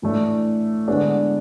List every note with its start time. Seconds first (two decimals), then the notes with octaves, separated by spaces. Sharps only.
0.02 A2 E3 A3 D4
0.88 D3 G#3 B3 D4